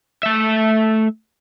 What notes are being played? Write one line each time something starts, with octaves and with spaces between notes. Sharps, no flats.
A3 E5